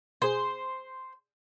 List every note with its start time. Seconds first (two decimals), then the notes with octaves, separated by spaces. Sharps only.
0.22 B2 G#4 C5